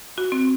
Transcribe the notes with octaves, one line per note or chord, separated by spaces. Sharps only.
F#4
C4